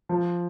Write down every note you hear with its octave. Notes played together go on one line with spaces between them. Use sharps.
F3